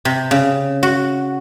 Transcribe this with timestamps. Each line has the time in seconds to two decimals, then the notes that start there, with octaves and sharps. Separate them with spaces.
0.05 C3
0.31 C#3
0.83 F#4